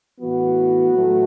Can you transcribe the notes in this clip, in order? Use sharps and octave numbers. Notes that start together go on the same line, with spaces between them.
A2 E3 B3 F#4
A2 F#3 A3